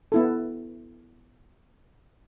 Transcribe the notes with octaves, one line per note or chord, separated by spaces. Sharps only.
B3 E4 A4